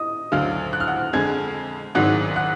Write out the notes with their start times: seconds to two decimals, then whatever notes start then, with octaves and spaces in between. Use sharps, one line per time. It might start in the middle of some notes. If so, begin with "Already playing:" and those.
Already playing: D#5 D#6
0.32 D2 D3 F#3 F5 F6
0.73 F#6
0.80 F6
0.88 F#5 F#6
1.13 F2 D3 G#3 G#5 G#6
1.95 G#1 G#2 D#3 F#3 F#5 F#6
2.36 F#5 F#6